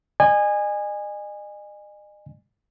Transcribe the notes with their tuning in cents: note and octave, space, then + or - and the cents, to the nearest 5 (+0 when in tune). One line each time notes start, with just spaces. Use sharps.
D#5 -40 G#5 -15